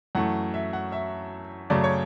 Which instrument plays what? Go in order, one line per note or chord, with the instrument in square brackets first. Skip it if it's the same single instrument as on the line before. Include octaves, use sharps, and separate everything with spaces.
[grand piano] F#2 E3 A3 F#5
E5
F#5
E5
F#2 C#3 F#3 A3 D5
C#5